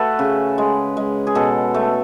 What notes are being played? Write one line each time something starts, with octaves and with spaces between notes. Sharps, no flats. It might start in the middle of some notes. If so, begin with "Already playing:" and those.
Already playing: A3 F#4 A4 B4
C#3
G#3
G#3
G#4
B2 A4
A3